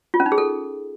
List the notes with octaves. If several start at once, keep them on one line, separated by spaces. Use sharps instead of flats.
F4
C#4
D#4
G#4
A4